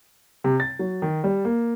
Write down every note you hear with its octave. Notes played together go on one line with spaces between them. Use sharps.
C3
A6
F#3
D#3
G3
A#3